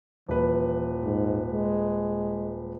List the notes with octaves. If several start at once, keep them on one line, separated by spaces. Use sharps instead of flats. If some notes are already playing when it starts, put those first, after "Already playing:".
D#1 E3 B4
G#2
G#3